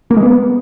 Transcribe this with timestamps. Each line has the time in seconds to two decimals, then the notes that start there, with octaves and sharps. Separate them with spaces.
0.11 A#3
0.17 G#3
0.23 B3